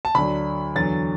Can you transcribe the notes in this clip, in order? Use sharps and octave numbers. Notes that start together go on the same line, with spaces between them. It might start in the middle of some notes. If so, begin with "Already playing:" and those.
A5
D2 D3 F#3 D4 B5
E2 D3 F#3 A6